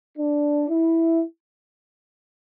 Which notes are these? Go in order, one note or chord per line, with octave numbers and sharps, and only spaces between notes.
D4
E4